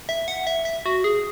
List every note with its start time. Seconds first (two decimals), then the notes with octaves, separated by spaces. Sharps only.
0.09 E5
0.28 F#5
0.47 E5
0.65 E5
0.86 F#4
1.04 G#4